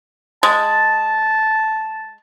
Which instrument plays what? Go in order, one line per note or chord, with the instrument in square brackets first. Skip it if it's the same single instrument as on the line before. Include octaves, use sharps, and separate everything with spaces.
[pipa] G#3 [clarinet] A5